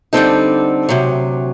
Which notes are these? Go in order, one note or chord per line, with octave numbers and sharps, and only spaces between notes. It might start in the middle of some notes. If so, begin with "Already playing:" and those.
D3 G3 C4 D#4 A4
D2 C3 F#3